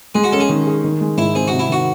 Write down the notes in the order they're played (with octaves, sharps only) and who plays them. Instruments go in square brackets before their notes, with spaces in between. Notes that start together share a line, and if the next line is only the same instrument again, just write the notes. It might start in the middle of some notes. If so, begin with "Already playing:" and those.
[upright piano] G#3 [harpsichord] G#4
[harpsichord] F#4
[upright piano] C#4 [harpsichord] A4
[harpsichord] G#4
[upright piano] D#3
G#4
D#3
G#3
[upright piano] G#2 [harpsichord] E4
[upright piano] C4 [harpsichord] G#4
[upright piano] C3 [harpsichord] F#4
[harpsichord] E4
[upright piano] D#3 [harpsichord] F#4